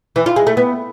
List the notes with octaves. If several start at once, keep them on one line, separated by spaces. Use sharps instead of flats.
E3
F4
G#3
A3
B3